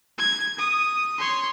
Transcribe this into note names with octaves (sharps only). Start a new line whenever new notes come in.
G#6
D#6
C#5 C6